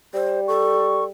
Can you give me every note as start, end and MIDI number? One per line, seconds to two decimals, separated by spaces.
0.14 1.09 55
0.14 0.40 72
0.48 1.04 69
0.48 1.04 85